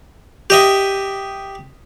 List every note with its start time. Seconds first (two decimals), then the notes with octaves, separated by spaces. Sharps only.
0.50 G4 D#5 E5